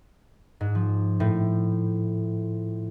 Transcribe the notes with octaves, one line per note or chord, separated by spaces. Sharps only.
G#2
F3
A2